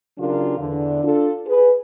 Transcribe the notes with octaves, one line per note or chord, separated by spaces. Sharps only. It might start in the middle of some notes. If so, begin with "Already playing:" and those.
C#3 F#3 D4 F4 G4 A#4
E2 D3 D4
D4 F4 A4
G#4 B4